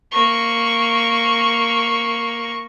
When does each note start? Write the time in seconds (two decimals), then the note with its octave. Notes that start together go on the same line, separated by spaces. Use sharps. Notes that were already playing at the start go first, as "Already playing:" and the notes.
0.12 A#3 C#6